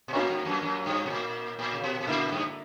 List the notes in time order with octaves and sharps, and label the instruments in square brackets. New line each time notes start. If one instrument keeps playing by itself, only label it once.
[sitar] B2
[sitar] A#2 [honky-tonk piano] A#3 C#4 F#4 A#4 C#5
[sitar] G2
F#2
F#2
G2
B2
A#2
A#2
C#3
B2
B2
[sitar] A#2 [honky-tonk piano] D3 A#3 E4
[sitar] G2